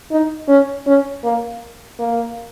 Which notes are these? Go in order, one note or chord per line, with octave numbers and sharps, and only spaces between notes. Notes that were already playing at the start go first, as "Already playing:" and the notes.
D#4
C#4
C#4
A#3
A#3